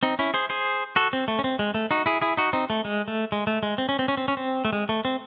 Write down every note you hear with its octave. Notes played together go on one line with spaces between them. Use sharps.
C4 D#4
C#4 E4
G#4 C5
G#4 C5
F#4 A4
C4
A3
C#4
C4
G#3
A3
D#4 F#4
E4 G#4
E4 G#4
D#4 F#4
C4 D#4
A3
G#3
A3
G#3
A3
G#3
C4
C#4
C4
C#4
C4
C#4
C4
A3
G#3
A3
C4